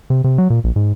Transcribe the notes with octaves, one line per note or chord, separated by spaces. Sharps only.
C3
C3
F#3
A#2
A#1
G#2